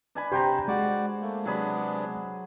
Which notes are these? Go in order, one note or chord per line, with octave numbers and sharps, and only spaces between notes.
D4 G#5 B5
C3 G4 C5 G5 A#5
G#3 F#4 D5
A3 A#3
C3 F#3 B3 D4 G#4 B5